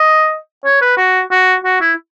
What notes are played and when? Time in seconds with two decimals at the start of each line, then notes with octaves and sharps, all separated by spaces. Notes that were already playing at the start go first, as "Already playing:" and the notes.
Already playing: D#5
0.65 C#5
0.81 B4
0.97 F#4
1.31 F#4
1.64 F#4
1.81 E4